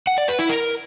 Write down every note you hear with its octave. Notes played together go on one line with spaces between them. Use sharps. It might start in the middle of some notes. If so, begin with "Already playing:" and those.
F#5
D5
B4
E4
A#4